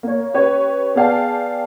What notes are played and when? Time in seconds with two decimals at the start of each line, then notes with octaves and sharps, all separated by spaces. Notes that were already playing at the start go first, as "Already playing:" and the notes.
0.03 A#3 C#5
0.34 C#4 G4 B4 C#5
0.95 B3 G#4 D5 F5 G5 A5